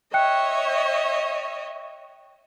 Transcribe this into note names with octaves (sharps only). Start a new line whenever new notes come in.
C#5 D#5 E5 G5 F#6 C#7